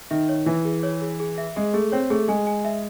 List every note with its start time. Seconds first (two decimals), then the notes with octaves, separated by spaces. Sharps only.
0.11 D#3 E5
0.29 C#5
0.46 E3 E5
0.65 G#4
0.83 C#5
1.01 G#4
1.20 G#4
1.38 E5
1.56 G#3 G#4
1.73 A3 G#4
1.92 C4 C#5
2.10 A3 G#4
2.28 G#3 G#5
2.47 G#5
2.65 E5